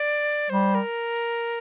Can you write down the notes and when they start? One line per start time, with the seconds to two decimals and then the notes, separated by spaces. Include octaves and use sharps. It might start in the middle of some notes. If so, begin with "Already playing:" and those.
Already playing: D5
0.50 G3 C5
0.75 A#4